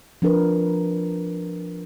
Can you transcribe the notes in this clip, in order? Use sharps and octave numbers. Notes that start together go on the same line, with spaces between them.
F3 D4 A#4 B4